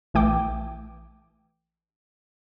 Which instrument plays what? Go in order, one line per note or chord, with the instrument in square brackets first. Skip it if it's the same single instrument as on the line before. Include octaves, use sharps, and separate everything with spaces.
[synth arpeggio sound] A#1 E3 A3 G5 D6